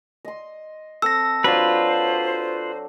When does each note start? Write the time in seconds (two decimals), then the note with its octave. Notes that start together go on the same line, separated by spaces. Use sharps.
0.25 D#5 C6
1.02 C4 A4 E6 A#6
1.44 F#3 D4 F4 B4 C5 C6